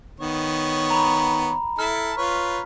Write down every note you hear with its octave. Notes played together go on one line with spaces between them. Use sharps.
D#3 B3 C#5
A#5 B5
E4 A4 A5 F6 B6
F4 B4 C#5